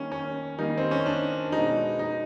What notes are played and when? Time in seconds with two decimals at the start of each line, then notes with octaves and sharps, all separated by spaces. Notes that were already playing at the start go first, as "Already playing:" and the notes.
Already playing: D#3 G3 A#3 C#4
0.12 C#4
0.59 D#3 G3 A#3 D#4
0.78 C4
0.91 C#4
1.06 D4
1.52 B2 G#3 D#4
1.99 D#4